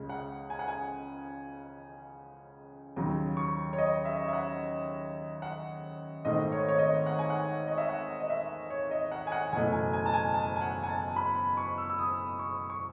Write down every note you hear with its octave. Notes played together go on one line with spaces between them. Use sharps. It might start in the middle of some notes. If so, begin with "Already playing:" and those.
Already playing: C#2 C#3 G#3
F#5
G#5
F#5
G#5
D#2 C#3 F#3
C#6
C#5
D#5
E5
E5
F#5
F#5
G#1 G#2 D#3 A3 D#5
C#5
C#5
D#5
F#5
G#5
F#5
D#5
E5
F#5
D#5
E5
C#5
D#5
F#5
G#5
F#5
F#1 E2 B2 A3 G#5
G#5
G#5
A5
G#5
A5
G#5
F#5
G#5
A5
B5
C#6
E6
E6
D#6
C#6
C#6